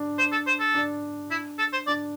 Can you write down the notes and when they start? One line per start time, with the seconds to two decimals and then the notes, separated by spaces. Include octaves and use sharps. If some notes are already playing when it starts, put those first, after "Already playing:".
Already playing: D4
0.18 C5
0.32 A4
0.47 C5
0.59 A4
0.74 D4
1.31 E4
1.58 A4
1.72 C5
1.87 D4 D5